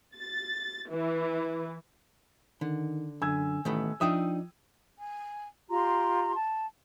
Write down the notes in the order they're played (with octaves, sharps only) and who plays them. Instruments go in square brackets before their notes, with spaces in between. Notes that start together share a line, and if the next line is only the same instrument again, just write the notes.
[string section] A6
E3
[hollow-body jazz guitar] D3 [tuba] D#3
[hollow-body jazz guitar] F#2 [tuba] D3 [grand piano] G#5 E6 G#6
[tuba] A1 [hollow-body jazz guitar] D#3 A3 B3
[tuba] F3 [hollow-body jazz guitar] D4 D#4 E5 [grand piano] G5 D#6
[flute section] G#5
F4 G4 A#5 C6
A5